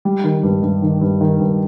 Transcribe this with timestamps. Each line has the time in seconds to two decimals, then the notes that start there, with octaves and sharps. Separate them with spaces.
0.05 G3
0.24 D#3
0.43 G2
0.62 G2
0.82 D#3
1.01 G2
1.21 D#3
1.39 G2